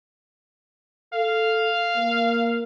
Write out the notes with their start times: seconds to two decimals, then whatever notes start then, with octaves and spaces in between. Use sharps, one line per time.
1.14 A4 F5
1.97 A#3